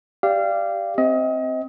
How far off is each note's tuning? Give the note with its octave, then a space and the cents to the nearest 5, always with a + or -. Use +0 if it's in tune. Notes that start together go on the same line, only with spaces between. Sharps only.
G4 +0 D5 +0 F5 -25
C4 +0 D#5 +30